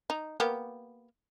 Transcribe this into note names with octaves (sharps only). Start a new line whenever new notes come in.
D#4
A#3 B3 G4